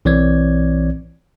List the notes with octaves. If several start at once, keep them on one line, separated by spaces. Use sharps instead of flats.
B1 E3 C4 C#5 D5 G#6